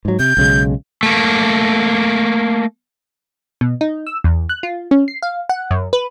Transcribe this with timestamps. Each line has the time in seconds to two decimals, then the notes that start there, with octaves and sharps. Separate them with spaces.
0.05 G#2 F#3
0.19 C3 G6
0.37 B1 C#3 G#3
1.03 A3 A#3
3.61 B2
3.81 D#4
4.07 E6
4.24 E2
4.49 F#6
4.63 F4
4.91 C#4
5.08 C7
5.23 F5
5.49 F#5
5.71 F#2
5.93 B4